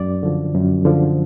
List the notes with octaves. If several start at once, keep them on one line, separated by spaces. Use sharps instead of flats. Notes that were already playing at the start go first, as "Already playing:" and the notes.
Already playing: F#2 D5
D3 F3
F#2
D3 F3